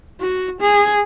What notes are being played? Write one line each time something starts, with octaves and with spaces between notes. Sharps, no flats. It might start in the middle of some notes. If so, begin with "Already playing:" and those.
F#4
G#4